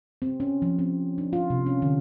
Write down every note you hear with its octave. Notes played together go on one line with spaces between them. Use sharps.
C4
C#4
F3
C4
D4
F4
C3
C#4
D3